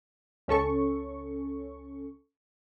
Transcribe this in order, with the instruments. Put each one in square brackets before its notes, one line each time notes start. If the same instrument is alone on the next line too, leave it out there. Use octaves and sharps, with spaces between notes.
[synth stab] C#2 C#4 A4 C#6